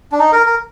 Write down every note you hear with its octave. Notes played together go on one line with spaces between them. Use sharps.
D4
D#4
A#4
A#4